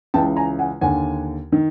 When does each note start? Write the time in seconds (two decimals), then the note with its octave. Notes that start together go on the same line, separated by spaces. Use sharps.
0.14 C#2 C#3 E3 G5 A5
0.36 G#5 A#5
0.59 F#5 G#5
0.81 D#2 D3 F#5 G#5
1.52 D#3